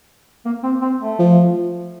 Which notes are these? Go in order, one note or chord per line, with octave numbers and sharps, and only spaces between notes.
A#3
C4
C4
A3
F3